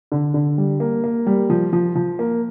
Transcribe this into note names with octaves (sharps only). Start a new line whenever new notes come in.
D3
D3
G3
A#3
A#3
G3
F3
F3
F3
A#3